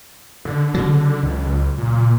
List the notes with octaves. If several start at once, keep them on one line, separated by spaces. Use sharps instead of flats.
D3
C#3 F#3
C#2
A#2